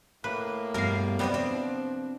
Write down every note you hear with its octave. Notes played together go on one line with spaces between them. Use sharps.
A2 A#3 B4
G2 B2 G3 A#4 F5
F#2 C3 G3 B3 C4 D#5
C4 D4
F3